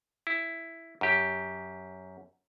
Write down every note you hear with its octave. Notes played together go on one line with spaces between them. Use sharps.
E4
F#2 G4